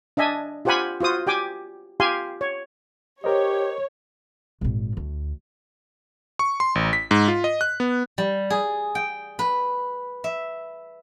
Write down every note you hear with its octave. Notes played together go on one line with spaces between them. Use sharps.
D4 D#5 E5 G#5
F4 G4 C5 F#5 G#5 B5
F4 F#4 C5 D#6
G4 G5 G#5 D6
F4 G4 F5 G#5 C6
C#5
G4 A#4 C5 C#5 D#5
G#1 A#2
D2
C#6
C6
A1
B6
G#2
F4
D#5
F#6
B3
G3
G#4
G5
B4
E5